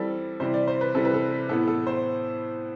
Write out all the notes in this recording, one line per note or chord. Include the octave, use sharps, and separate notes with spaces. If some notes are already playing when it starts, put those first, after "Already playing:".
Already playing: E3 G3 C4 A4
C3 E3 G3 C5
D5
C5
B4
C3 E3 G3 A4
B4
A4
A2 E3 B3 A4
A4
C5